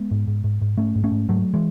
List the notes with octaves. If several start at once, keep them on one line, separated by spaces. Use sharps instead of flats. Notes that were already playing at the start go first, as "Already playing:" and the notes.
Already playing: G#3 B3
G#2
G#2
G#2
G#2
G#2 A3 C#4
G#2
A3 C#4
G#2
G#2 F#3 A3
E3 G#3